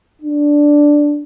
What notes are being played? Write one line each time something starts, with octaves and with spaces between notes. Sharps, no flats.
D4